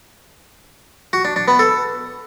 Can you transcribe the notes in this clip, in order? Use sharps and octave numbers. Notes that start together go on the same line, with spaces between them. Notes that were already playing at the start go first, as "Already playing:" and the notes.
F#4
D4
D4
B3
A4